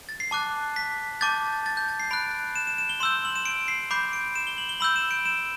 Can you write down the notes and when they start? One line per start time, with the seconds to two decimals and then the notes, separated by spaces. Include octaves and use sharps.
0.09 A6
0.20 C7
0.31 A5 D6 F#6
0.76 B6
1.21 A5 D6 G6 A6
1.66 A6
1.77 G6
1.89 A6
2.00 C7
2.11 B5 F#6 D7
2.56 E7
2.67 E7
2.78 E7
2.89 G7
3.00 C6 E6 G6 E7
3.25 F#7
3.36 E7
3.45 D7
3.68 C7
3.91 B5 D6 G6 C7
4.13 D7
4.35 E7
4.47 G7
4.58 F#7
4.69 G7
4.80 B5 E6 G6 F#7
4.96 E7
5.11 D7
5.26 E7